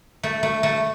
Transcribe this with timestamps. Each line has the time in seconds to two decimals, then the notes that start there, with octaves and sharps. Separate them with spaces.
0.23 A3
0.43 A3
0.63 A3